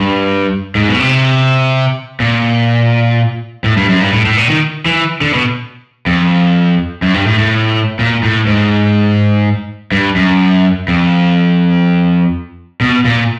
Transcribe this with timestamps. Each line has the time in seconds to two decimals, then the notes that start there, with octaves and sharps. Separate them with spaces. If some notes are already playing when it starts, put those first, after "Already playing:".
Already playing: G2
0.75 G#2
0.89 B2
1.00 C3
2.20 A#2
3.64 A2
3.77 G2
3.89 F#2
4.01 G2
4.13 A2
4.26 A2
4.37 A#2
4.49 D#3
4.86 E3
5.21 D3
5.34 B2
6.06 F2
7.02 F#2
7.14 G2
7.27 A2
7.39 A2
7.99 A#2
8.23 A2
8.47 G#2
9.92 G2
10.16 F#2
10.88 F2
12.81 B2
13.05 A#2